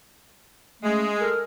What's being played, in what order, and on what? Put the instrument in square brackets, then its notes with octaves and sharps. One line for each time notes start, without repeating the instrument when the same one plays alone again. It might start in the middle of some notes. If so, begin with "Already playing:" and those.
[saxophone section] G#3 [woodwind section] A3 C#4
[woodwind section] A4 A#4